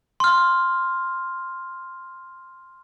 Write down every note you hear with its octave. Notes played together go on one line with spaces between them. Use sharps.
C6 F6